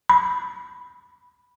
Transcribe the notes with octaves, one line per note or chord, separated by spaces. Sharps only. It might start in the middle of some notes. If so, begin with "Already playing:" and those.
B5